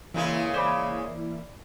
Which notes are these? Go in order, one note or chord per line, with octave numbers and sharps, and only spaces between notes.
A#2 C#3 E3 G#3 A#3 E4
C5 D5 B5